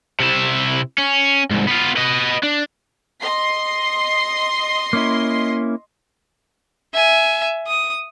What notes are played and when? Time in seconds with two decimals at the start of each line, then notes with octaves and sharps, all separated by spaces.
0.20 C3 E4
0.98 C#4
1.50 C2 G#2
1.67 B3 F4
1.97 B4 D#5
2.43 D4
3.21 D#5 C6 C7
4.93 A#3 C#4 E4
6.93 E5 G#5
7.67 D#6